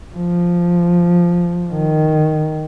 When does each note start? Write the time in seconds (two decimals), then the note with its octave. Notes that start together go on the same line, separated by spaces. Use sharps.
0.15 F3
1.73 D#3